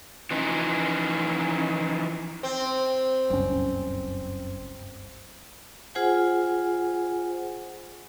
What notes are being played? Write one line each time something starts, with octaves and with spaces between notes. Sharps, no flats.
E3 F3 C#4 D#4
C4
F#1 C#2 G2 C#4
F4 G#4 C5 F#5 G#5